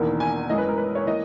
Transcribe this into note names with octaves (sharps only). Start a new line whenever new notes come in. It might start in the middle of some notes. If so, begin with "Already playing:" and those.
Already playing: E1 E2 D#3 A#3
G#5
F#2 E3 G#3 D#5
B4
A#4
B4
C#5
E3 A#3 D#5